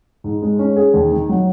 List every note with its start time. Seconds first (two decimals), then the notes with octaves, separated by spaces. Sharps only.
0.24 G#2
0.42 G#3
0.59 C#4
0.76 G#4
0.94 D#2
1.12 D#3
1.29 F#3